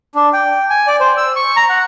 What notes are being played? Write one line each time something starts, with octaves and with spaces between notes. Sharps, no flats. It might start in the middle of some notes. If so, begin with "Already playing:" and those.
D4
G5
G#5
D5
C5
E6
C#6
A#5
F#5